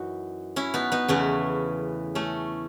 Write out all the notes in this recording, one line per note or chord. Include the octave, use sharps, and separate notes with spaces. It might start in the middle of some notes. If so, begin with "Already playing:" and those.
Already playing: F#2 E3 D#4 F#4
C#4 E4
B3 D#4
B3 D#4
E2 C#3 E3 A3 C#4
A3 C#4